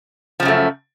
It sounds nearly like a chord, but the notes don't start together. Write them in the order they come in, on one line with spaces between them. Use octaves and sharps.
F3 C#3 F#2 A3